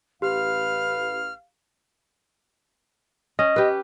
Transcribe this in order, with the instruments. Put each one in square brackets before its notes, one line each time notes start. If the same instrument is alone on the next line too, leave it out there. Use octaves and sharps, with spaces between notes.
[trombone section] A1 B4 [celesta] G4 [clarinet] F5 [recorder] F6
[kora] C#4 [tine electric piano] D#5
[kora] G4 B4